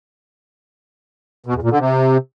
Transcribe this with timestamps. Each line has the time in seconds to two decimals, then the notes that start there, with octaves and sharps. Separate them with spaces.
1.46 B2
1.54 E2
1.63 A#2
1.71 D3
1.79 C3